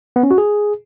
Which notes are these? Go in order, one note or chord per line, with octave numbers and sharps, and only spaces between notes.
B3
C#4
F#4
G#4